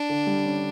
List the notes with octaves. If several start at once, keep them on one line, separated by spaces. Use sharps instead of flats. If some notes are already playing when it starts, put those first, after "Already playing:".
Already playing: D4
D3
G3
C#4